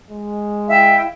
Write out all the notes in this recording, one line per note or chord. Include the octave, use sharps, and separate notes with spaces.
G#3
E4 E5 F5 G5